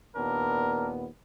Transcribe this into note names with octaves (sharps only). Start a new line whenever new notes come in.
D#2 A#2 B3 D4 A#4